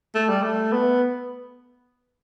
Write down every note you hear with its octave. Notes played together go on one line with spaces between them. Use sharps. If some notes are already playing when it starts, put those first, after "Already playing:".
A3
G3
A3
B3